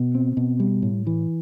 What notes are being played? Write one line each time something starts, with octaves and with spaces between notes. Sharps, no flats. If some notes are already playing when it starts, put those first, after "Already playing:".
Already playing: B2
C4
B2
G3
A2
E3